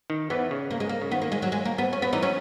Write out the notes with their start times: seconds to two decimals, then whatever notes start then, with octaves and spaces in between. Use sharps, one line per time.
0.10 D#3
0.30 E2 E3 B3
0.51 C#3
0.71 A#3
0.80 G#3
0.89 A#3
1.02 C#3
1.11 D#3 B3
1.22 A#3
1.32 G#3
1.42 F#3
1.52 G#3
1.65 A#3
1.78 B3
1.93 C#4
2.02 B3
2.12 E2 E3 D#4
2.23 F#3 C#4